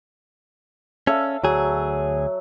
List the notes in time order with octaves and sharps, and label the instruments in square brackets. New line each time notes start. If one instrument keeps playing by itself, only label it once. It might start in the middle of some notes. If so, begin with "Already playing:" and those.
[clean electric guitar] C#4 [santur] A4 E5 F5
[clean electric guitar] D2 G#4 [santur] F#3